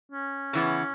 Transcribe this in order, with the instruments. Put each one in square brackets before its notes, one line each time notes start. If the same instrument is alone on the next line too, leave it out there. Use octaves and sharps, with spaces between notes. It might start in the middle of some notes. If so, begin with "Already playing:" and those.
[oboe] C#4
[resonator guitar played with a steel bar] C#3 E3 B3